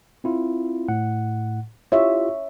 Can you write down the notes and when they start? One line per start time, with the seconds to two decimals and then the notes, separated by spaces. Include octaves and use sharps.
0.24 C4 E4 F4
0.89 A2 F#5
1.92 E4 F4 G4 C#5 E5